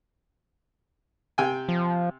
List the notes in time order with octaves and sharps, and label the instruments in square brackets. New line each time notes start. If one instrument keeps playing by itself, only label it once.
[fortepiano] C3 G5 G#5
[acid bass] F3